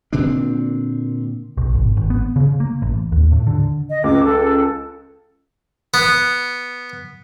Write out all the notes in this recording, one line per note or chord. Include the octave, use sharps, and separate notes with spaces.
A#2 D3 C4 D4
B1
G#1
G#1
B3
C#3
A#3
A1
D#2
A2
D3
D#5
C#2 D6
A4
B3